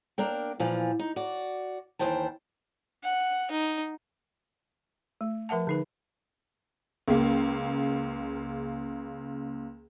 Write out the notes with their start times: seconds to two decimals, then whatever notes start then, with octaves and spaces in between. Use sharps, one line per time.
0.18 A#3 D4 A#4 G5
0.60 A#2 E3 F3
0.99 D#4
1.16 F#4 D5
1.99 D#2 E3 C5 G5 A5
3.04 F#5
3.51 D#4
5.21 A3
5.49 F3 A#4 E5 F#5 A5
5.67 D3 D#4 B4
7.08 C#2 C#3 A#3